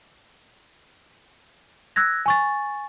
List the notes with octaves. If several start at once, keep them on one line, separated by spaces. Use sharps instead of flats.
E6 F#6 G#6 A#6
G#5 C#6 A6